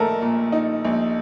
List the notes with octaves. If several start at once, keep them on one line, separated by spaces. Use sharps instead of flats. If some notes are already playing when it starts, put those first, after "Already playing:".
Already playing: A#1 A3 D#4 A#4 A5 A#5
A#2
D#4
A#1